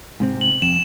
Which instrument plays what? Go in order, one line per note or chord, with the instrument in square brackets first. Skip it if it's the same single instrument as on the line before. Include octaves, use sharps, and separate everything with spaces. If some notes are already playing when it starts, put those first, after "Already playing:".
[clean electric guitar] G#2 C3 C4
[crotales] F#7
[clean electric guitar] F2 [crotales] E7